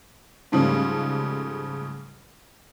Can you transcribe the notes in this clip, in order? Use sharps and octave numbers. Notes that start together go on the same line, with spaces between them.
G#2 C#3 F3 G3 A3